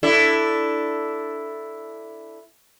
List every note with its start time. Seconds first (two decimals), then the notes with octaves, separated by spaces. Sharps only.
0.03 D4 E4 A4